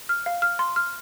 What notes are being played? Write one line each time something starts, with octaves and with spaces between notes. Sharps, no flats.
F6
F5
F6
C6
F6